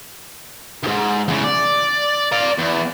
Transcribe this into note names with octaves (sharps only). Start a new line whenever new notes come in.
D2 G#2
E2 C#3
D5
D5 F5
E2